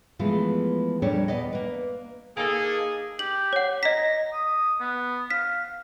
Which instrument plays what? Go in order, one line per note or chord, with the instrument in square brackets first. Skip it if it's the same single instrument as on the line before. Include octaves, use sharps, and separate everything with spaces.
[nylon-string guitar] E3 F3 G#3 A3 B3 F4
F2 A#2 G3 D4 A4 C#5
E2 B3 D5 D#5
A#3 B4
[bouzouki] A#3 D#4 A4 [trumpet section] G#4
[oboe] G4 [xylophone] F#7
[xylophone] C#5 F#5
[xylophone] D#5 B6 [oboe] A#5
[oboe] D#6
B3
[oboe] F5 [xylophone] B6